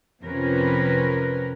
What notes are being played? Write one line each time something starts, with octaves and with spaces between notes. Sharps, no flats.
F2 C3 F3 C#4 A#4 B4